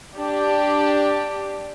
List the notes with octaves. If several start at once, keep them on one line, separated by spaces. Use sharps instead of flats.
D4 G4